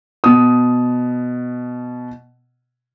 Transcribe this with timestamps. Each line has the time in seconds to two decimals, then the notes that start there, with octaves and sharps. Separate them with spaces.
0.24 B2 D#6